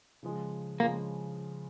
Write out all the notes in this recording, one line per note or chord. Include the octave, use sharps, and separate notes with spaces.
C#3 F3 G#3
C#3 F3 G#3 A#3